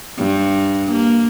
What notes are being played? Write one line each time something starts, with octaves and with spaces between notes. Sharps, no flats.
G2
A#3